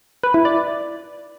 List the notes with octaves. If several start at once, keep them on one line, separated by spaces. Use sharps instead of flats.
B4
E4
D5